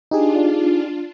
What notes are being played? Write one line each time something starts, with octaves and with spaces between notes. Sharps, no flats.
D4 D#4 F4 G4 G#4